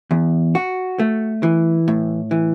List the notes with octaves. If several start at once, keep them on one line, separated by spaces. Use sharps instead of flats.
E2
F#4
A3
E3
A2
E3